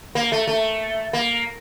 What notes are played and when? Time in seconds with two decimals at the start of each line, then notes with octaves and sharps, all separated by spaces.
0.15 A#3
0.32 A3
0.47 A3
1.13 A#3